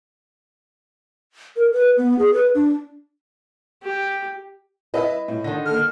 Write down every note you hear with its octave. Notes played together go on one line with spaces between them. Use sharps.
A#4
B4
B3
G#4
B4
D4
G4
E4 B4 D#5 E5
A2
D3 D#3 A#6
A#3 A4 F6